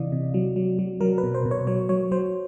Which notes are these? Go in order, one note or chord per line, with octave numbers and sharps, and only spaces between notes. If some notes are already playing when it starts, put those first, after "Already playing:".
Already playing: C3 E3 D5 D#5 F5
C3
F#3
F#3
F#3
F#3 A#4
B4
B2
C5
B2
C#5
F#3 C#5
F#3 C#5
F#3 C5